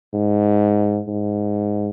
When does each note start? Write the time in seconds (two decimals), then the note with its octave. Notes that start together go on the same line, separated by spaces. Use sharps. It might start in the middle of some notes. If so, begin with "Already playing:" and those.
0.13 G#2
1.08 G#2